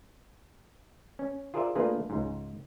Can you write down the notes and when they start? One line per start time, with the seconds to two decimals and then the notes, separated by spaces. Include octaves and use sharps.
1.19 C#4
1.54 F4 G#4 A#4 C5 D5 E5
1.75 A3 A#3 D4 F4 G#4 B4
2.10 C#2 G#2